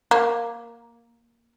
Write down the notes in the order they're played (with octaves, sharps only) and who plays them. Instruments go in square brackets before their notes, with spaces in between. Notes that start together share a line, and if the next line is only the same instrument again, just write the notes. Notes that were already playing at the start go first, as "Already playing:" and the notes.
[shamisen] A#3